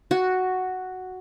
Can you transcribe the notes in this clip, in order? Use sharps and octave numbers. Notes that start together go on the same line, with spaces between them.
F#4